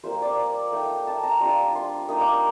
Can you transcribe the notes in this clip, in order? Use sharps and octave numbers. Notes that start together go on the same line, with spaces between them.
G3 A#3 F4 C5
D5
A3 D#4 G5
A5
A#5
G3 D4 F4 C6
C6
A#3 D#4 D#6
D6